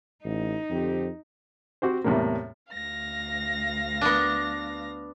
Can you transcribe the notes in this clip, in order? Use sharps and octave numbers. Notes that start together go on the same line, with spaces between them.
A1 D#4
F2 D3 C4 G4
C4 F#4 G4 C5
E2 A2 C3 G3 A#3
D2 F5 A#6
B3 D4